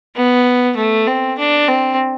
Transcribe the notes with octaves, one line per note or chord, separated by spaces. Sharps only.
B3
A3
C4
D4
C4